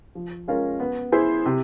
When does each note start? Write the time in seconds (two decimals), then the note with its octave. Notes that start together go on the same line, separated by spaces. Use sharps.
0.15 F3
0.47 G#3 C#4 F4 A#4
0.80 B3
1.12 E4 G#4 C5
1.46 C3